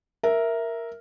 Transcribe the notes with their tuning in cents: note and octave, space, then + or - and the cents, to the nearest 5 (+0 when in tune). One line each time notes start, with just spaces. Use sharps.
A#4 +0 E5 +0